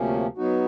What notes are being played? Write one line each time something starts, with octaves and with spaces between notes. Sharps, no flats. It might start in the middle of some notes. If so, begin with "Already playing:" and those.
Already playing: D2 C3 F3 A#3 C#4
F#3 B3 D#4 F#4